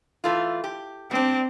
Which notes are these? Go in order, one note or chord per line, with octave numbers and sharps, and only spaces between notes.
E3 A3 F4
G4
G3 C4 D4